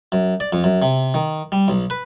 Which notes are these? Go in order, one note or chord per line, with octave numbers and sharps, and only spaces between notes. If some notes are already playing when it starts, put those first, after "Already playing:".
F#2
D5
F2
F#2
C3
D#3
G3
B1
B4